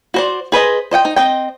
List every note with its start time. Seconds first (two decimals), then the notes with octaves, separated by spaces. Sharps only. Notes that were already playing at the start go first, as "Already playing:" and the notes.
0.14 F#4 C5 D5
0.52 G#4 B4 C5 D#5
0.91 C5 D#5 F#5 G5
1.05 D#4
1.16 C4 D#5 G5